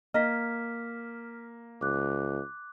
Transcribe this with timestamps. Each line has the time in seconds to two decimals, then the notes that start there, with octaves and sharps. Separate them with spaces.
0.14 A#3 D#5 F6 B6
1.81 C#2 D6 F#6